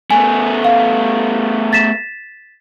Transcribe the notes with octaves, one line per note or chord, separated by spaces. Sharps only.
A3 B3 G#5
F5
A6 B6 E7